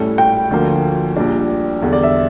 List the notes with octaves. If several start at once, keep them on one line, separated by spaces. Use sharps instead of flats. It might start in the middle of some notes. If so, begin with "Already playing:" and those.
Already playing: A2 G3 C#4 E4 A4
G5
D2 D3 F3 A#3
A#1 A#2 G3 D4
E2 D3 G3
D5
E5